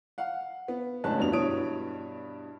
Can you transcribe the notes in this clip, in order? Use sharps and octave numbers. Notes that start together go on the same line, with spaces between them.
F5 F#5
B3
G1 A2 G#3 C#4 A5 F#6
E1 A#1 G2 B2 B3 F7
G2 B2 E4 C#5 D#6 D7